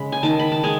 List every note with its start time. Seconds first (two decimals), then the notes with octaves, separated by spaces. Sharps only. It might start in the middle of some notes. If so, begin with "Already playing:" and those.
Already playing: C#3 G#3 B5
0.12 G#5
0.23 D#3 A5
0.39 B5
0.52 A5
0.63 G#3 G#5